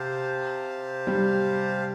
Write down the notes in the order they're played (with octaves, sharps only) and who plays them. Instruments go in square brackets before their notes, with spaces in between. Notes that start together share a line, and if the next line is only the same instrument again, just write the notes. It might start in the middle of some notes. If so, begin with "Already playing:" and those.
Already playing: [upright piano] C3 [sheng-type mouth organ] G4 C5 F5 A5
[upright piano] G3